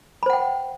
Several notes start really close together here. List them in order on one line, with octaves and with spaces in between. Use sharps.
B5 C5 F#5 G5